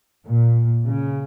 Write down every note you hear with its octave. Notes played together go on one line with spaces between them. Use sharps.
A#2
C#3